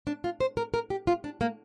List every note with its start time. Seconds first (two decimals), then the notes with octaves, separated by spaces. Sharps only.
0.07 D4
0.24 F4
0.40 C5
0.57 A#4
0.74 A#4
0.90 G4
1.07 F4
1.24 D4
1.41 A#3